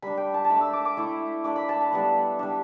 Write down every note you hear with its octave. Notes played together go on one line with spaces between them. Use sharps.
G3 D4 B5
G5
A5
A5
A3 D4 B5
E6
D6
D6
A3 E4
A3 D4 D6
B5
A5
B5
G3 B3 D4
G3 D4